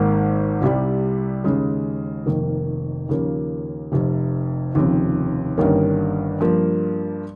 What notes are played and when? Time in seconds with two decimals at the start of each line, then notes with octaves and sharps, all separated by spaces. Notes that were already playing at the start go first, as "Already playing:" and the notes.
Already playing: G#1 G#2 D#3 A#3
0.61 C2 C3 G3
1.44 D#2 C#3 G#3
2.26 F1 F2 D#3 A#3
3.09 D#2 C#3 F3 A#3
3.92 F1 F2 C3
4.74 F1 D#2 C#3 F3 C4
5.58 G1 G2 D#3 A#3 C#4
6.40 G2 F3 A#3